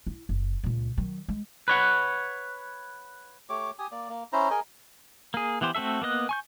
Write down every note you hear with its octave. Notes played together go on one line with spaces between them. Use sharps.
E4
F#1
C#2 A#2
D#3 F#3
G#3
B4 C#5 F#5
A3 G4 C#5 D6
G4 G#5 D#6
A#3 D5
A#3
C#4 E4 C5 A#5
G#4 A#4 D#5 G#5
A#3 G#4
E3 B3 G4 C5
A3 C4 F#4 A4 E5
A#3 B3 D#5 F#6
G#5 C#6 G6